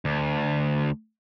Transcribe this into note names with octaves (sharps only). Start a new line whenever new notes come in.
D2